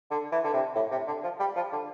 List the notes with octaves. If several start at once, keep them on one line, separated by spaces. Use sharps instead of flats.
D3
E3
D3
C3
A2
C3
D3
F3
G3
F3
D3